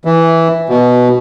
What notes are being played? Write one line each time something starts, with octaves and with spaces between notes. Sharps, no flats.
E3
B2